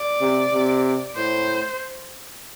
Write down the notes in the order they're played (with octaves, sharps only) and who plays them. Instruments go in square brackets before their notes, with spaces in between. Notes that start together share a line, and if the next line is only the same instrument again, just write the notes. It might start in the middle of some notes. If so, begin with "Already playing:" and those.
Already playing: [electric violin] D5
[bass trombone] C3
C3
[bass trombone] A2 [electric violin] C5